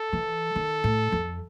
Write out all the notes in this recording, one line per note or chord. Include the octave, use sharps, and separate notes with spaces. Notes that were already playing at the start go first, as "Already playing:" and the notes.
Already playing: A4
E3
D#3
A2
F2